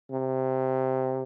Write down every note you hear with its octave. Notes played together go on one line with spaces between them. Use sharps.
C3